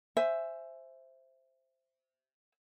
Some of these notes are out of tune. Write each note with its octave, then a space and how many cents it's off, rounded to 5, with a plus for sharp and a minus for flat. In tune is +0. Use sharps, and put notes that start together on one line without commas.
C5 +0 E5 +10 G#5 +0